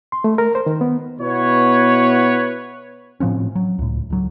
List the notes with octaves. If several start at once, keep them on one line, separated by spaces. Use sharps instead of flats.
C6
A3
A#4
C5
D#3
B3
B2 B3 E4 B4 C#5
A2 F3 C4 C#4
F#3
C#2 A2
C#2 F#3